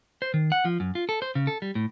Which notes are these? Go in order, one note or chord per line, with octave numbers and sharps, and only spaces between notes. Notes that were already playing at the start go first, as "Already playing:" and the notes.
C5
D#3
F#5
F3
F#2
F4
A4
C5
C#3
A4
G3
A2